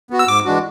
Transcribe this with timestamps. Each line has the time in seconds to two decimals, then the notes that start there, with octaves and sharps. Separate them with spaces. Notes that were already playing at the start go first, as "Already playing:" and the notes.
0.10 B3 F#4
0.19 E6
0.27 G#2 D6
0.45 E3 G#3 D4 F#4